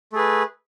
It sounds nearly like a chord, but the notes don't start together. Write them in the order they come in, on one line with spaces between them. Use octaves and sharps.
A3 G#4 B4